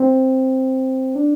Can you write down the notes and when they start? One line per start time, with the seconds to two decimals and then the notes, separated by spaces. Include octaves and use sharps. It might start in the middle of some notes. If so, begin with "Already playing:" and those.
Already playing: C4
1.15 D4